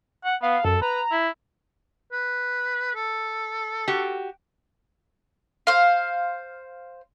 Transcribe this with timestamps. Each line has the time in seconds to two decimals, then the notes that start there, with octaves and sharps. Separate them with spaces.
0.25 F#5
0.42 B3 F5
0.65 F#2 A4
0.82 B4 A#5
1.12 E4
2.12 B4
2.95 A4
3.88 F#4 G4
5.67 C5 F5